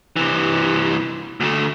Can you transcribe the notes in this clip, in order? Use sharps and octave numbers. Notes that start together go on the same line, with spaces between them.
C3 E3
D2 A3